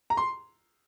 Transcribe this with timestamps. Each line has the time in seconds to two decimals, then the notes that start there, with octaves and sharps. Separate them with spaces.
0.10 A#5
0.17 C6